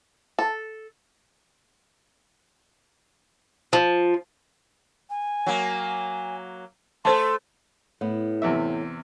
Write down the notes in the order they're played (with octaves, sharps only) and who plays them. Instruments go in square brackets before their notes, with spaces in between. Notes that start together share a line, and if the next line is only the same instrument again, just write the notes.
[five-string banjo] A4
[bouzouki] F3
[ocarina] G#5
[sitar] F#3 A#3
[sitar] A3 A4 [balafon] C5 A5 [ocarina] C6
[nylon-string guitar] A2 B3
[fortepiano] E2 C3 E5